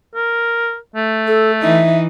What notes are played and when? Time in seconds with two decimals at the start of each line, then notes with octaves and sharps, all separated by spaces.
0.15 A#4
0.96 A3
1.27 A4
1.61 E3 D#4 E5